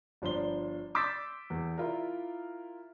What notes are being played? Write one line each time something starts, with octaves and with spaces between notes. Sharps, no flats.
G1 F3 D4 C6 G7
C6 D6 E6 G6 A6 B6
E2
E4 F4 A#4